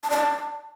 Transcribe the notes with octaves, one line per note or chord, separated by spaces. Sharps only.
A5
D5
A5